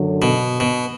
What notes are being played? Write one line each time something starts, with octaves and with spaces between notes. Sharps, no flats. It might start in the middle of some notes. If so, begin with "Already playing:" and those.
Already playing: F#2 D3 F#3
B2
B2